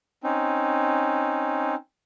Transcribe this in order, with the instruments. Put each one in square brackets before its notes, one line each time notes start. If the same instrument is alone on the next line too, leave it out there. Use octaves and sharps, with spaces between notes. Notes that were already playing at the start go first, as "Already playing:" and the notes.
[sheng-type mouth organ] C4 C#4 D#4